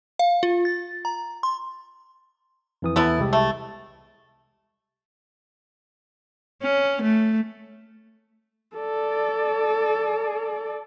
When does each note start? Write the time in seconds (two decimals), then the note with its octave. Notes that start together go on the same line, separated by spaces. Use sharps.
0.19 F5
0.43 F4
0.65 A6
1.05 A#5
1.43 C6
2.82 F2 E3 D#6
2.96 E2 E3 A3 B3 E4
3.19 C2 G#3 G4
3.33 A3
6.62 C#4
7.02 A3
8.76 A4 D5